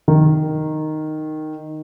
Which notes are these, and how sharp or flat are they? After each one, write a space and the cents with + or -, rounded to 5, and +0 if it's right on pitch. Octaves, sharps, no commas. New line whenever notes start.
D#3 -5